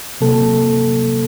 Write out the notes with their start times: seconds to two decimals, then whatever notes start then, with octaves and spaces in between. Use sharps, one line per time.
0.21 C3 F#3 A#3 A4